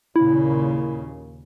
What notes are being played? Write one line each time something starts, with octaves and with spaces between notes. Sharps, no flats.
D#2 A#2 C#3 E4